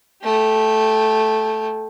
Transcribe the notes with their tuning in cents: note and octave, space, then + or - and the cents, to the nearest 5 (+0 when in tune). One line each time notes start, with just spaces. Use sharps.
A3 -10 G4 +0